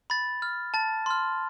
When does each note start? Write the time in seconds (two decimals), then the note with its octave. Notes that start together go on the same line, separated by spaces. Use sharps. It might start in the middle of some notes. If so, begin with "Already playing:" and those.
0.10 B5 A6
0.42 F6
0.74 A5 A6
1.06 C6 F6